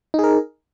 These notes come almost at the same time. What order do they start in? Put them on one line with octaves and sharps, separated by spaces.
D#4 G#4 A#4